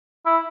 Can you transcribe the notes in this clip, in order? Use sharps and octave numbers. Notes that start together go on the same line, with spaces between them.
E4